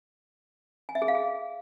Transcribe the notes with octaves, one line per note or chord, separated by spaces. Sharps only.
G#5
E5
G#4
F5
G#4